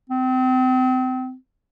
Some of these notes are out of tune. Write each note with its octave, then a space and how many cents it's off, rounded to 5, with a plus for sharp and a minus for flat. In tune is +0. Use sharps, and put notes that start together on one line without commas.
C4 -30